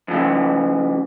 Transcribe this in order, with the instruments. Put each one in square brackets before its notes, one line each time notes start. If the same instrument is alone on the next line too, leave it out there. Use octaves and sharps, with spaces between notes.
[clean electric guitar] F2 C#3